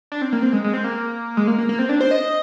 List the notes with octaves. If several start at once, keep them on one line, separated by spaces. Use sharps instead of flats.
D4
C4
A#3
C4
G#3
G#3
C4
A#3
G#3
A#3
A#3
A#3
C4
D4
C5
D#5